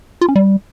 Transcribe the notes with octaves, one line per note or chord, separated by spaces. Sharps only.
F4
C#4
G3